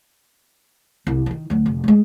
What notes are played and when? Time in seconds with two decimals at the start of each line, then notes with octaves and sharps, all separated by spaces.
1.07 C2
1.26 D#3 E3
1.50 D2 F#3
1.66 F1
1.84 G3 G#3